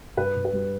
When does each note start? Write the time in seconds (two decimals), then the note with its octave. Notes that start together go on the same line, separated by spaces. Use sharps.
0.17 G2 B4
0.36 G2
0.45 B4
0.53 G3